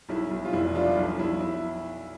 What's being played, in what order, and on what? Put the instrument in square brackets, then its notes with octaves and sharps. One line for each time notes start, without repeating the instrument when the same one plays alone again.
[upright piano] B1 E4
B1
F4
F1 E4
F3 D4 F4
B1
B1 E4
E4